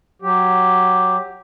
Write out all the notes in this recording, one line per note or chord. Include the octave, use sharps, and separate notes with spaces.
F#3 G4